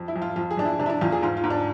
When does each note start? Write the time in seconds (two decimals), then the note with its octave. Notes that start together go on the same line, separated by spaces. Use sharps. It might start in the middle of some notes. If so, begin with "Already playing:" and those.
Already playing: F2
0.08 E4
0.16 F2
0.22 F4
0.36 F2 F4
0.51 G#4
0.57 F2 D4
0.65 E4
0.79 C3 D4
0.86 E4
0.90 D4
1.01 E2 F4
1.12 G#4
1.22 G#2 F4
1.37 F4
1.44 G#2
1.50 D4